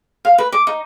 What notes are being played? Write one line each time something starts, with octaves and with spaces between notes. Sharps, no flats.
F5
B4
D6
D#4